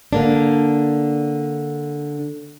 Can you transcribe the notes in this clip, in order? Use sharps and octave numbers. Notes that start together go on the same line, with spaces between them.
D3 A#3 D4